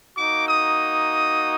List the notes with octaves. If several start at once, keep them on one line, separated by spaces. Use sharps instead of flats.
A#3 D#4 F#4 D6
D#6